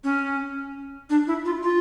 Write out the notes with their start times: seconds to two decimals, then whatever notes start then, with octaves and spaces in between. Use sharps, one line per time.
0.04 C#4
1.10 D4
1.27 E4
1.45 F4
1.63 F4